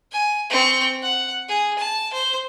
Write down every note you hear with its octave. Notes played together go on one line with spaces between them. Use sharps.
G#5
C4 C#6
F#5
G#4
A5
C5